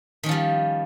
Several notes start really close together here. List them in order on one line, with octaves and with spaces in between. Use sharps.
D#3 C#4 F3 G3